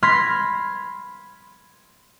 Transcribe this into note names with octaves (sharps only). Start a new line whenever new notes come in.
B5 C6 F6 G#6 A#6 B6